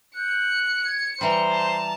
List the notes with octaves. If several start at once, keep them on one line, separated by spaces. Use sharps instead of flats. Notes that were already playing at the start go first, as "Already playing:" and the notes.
F#6 G6 C#7
G#6
E3 G3 C5 A#5
A5